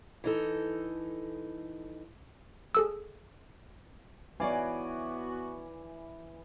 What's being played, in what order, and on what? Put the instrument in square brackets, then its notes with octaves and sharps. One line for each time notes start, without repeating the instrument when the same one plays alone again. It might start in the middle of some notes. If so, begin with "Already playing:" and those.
[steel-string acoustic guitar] E3 D#4 A4
[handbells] G#4 A4 E6
[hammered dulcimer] E3 G#5 D6 [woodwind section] B3 F#4 [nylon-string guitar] C#5 D5 F5